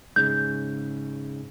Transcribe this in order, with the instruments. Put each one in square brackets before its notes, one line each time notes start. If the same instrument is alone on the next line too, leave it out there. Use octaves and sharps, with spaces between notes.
[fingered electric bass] G#2 C#3 [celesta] G6